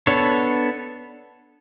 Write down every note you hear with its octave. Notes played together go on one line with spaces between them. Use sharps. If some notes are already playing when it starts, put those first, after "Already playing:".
B3 D4 A4 C#5